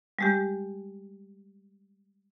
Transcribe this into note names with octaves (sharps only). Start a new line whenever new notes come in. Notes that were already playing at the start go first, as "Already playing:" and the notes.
G3 G#3 G4